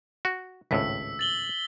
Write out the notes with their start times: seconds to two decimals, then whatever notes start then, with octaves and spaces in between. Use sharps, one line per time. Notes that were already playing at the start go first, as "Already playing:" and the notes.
0.25 F#4
0.71 G#1 C#2 A2 E6 B6
1.19 A6 F#7 G7